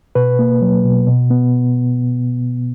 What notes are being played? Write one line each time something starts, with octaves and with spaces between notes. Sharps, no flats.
B2 B4
A#3
F#3
B2
B2
B3